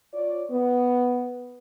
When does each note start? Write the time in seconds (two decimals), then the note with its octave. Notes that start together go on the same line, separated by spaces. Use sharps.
0.14 F4 C#5 D5
0.51 B3